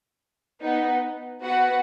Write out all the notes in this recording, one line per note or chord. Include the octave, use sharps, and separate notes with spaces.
B3 D#4 B4 F#5
B3 F#4 B4 F#5